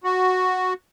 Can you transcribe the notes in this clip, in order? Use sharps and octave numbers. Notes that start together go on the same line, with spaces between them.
F#4